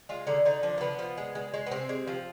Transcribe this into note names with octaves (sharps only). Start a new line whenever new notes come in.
G#3 F4
D3 D#4
D3 D#4
F3 D4
A#3
D3 B3
F3
G#3
G#3
G#3
B3
C3 C4
G#3
F3